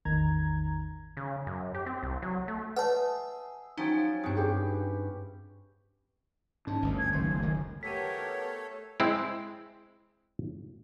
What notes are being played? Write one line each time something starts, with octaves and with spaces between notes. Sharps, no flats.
A1 E2 D#3 A#5 G#6
C#3
F#2
G4
C4
C2
F#3
A3
G#4 B4 C#5 D#5 E5 F#5 A5
F3 F#3 C#4 D#4 G5 A6
G2 C4 F#4 G#5 D#6
G4 G#4 B4 G5 A5
G#2 C#4 D4 A5
G1 D2 A#2
G#6
F#1 C#2 F#2 D#3 A3 C5
G#4
D#3
A3 B3 G4 A4 A#4 C#5 B6 D#7
G#3 C4 E4